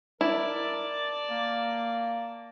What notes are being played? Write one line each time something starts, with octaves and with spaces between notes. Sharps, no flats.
E4 A#4 D5 A5
A#3